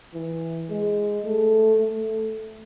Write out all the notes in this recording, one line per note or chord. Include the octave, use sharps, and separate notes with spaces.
E3
G#3
A3
A3